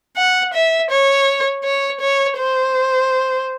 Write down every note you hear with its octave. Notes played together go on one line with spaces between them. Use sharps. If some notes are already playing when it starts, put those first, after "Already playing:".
F#5
E5
C#5
C#5
C#5
C5